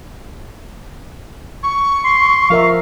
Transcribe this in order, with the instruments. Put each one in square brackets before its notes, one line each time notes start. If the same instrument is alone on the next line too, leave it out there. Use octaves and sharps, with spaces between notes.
[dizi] C#6
[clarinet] C6
[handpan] F3 A#4 E5 [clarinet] F5